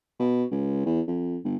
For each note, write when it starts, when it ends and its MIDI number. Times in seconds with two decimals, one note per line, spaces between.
0.19 0.44 47
0.51 0.84 37
0.86 1.01 40
1.08 1.38 41
1.45 1.57 31